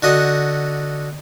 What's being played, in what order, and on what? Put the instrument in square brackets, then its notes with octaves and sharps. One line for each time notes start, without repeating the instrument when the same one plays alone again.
[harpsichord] D3 F#4 D#5